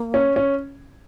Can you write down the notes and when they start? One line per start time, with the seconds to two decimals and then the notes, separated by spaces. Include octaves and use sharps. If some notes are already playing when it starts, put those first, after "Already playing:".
Already playing: A#3
0.14 C#4
0.36 C#4